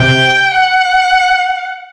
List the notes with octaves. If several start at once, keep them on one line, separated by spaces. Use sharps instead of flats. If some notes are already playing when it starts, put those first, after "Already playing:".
Already playing: C3 G5
F#5